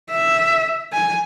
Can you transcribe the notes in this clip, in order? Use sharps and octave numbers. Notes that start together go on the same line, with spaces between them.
E5
G#5